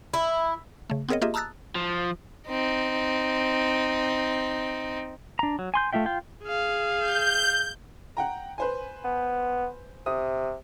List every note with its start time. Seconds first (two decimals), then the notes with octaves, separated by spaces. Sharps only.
0.14 E4
0.90 C#3 A3
1.09 B3 C4 G#4 A#4 C#5 D#5
1.22 A#3 F4 G4 G#4 D#5 E5
1.34 A5 A#5 D#6 E6 F#6 A6
1.75 F3
2.49 C4 D#4
5.39 D4 A#5
5.59 F#3
5.74 G#5 C6 G6
5.93 A3 C#4 F4 E5 G5
6.06 F4 G5
6.44 G#4 F5
7.00 G6
8.17 F#5 G5 A#5
8.58 B4 C5 G#5
9.04 B3
10.06 C3 D#6